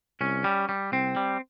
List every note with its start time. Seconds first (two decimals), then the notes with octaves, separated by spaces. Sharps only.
0.21 C2 C#4
0.44 G3
0.69 G3
0.92 C2 C4
1.16 G3